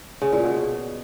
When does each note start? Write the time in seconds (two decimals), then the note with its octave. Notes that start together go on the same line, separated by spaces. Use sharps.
0.22 C#3
0.33 A#2
0.43 B2